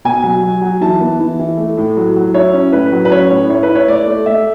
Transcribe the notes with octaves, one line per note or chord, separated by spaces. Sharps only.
B2 G#5
F#3
F#3
F#3
E3 A5
B3
E3
E3
A3
A2
F#3
F#3
E4 C#5
C#4
A2 B4
F#3
B4
C#4 C#5
A2
E4 C#5
B4
E4
C#5
A3 D5
A3
A3 E5